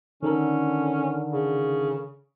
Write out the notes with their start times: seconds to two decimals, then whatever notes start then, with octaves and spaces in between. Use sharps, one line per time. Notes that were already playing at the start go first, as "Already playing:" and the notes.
0.23 D3 D#3 C#4 A4 A#4
1.32 C#3